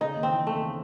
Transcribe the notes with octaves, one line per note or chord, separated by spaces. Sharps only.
C#3 D#4
D#2
C4
E3
D#2 A3
C#3